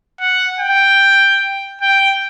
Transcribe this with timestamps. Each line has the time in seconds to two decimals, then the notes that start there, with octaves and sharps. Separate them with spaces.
0.20 F#5
0.60 G5
1.82 G5